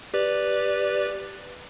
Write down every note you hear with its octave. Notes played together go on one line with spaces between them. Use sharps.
G4 B4 D5